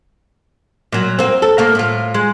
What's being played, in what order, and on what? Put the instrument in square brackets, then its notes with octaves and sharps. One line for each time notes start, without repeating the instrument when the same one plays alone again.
[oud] A#2 F#3
A#3 C4
A4
A3 A#3 F5
A2 F4
G#3